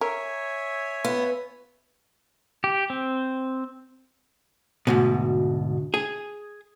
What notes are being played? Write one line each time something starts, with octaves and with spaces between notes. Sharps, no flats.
A#4 C#5 E5 G#5
B3 F4
G4
C4
D2 G#2 B2
G#4